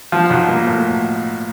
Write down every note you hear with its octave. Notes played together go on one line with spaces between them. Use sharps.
F3
B1
A#3
A2